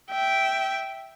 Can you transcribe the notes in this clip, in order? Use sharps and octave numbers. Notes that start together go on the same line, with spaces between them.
E5 G5